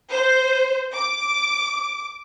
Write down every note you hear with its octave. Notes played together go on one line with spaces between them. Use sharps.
C5
D6